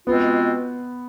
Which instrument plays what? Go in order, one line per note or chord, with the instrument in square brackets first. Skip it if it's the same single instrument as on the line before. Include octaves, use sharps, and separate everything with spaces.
[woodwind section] B2 G#3 C4 F4 [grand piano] B3